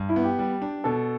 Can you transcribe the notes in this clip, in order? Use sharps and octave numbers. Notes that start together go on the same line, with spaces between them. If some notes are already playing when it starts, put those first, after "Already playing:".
Already playing: G2
E4
B3
G4
G3
D4
B2 A4